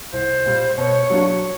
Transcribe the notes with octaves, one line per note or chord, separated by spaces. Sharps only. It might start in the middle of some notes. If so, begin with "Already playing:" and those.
C2 C5
A#2 G3
B2 C#5
F#3 A#3 D4 F#4